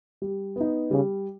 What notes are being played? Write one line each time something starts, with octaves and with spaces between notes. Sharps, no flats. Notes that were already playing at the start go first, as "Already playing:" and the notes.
G3
B3 D#4
C#3 G3